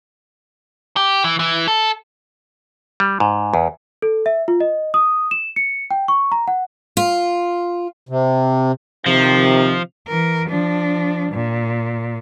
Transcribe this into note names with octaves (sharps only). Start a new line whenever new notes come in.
G4
E3
E3
A4
G3
G#2
E2
A4
E5
F4
D#5
D#6
E7
C#7
G5
C#6
A#5
F#5
F4
C3
C3 D#3 F3
E3 A#4
F3 D4
A#2